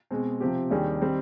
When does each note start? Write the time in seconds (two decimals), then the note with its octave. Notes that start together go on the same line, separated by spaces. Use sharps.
0.11 B2 G#3 C4
0.40 C3 F3 C4 G4
0.70 D#2 D#3 G3 D4 G#4
1.02 D#3 G3 C4